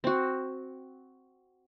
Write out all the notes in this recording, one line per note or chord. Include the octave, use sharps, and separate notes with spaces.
C4 F#4